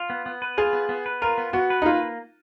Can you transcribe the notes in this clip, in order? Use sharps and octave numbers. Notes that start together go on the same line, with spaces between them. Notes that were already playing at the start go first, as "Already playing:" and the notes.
Already playing: F4
B3
B3
B4
F4 G#4
B3
B3
B4
F4 A#4
B3
B3 F#4
B4
D#4
A#3 F4